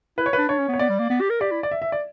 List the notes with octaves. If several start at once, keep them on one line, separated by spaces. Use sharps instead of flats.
E4 B4
C#5
D4 B4
D4 C#5
C#4
B3
C#5
B3 D5
G3
A#3
B3
G4
A#4
G4 D5
E4
D5
E5
E5
D5